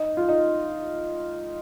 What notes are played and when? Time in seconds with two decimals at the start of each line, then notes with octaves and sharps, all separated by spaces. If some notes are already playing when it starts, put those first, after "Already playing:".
Already playing: D#4
0.17 F4
0.29 D#4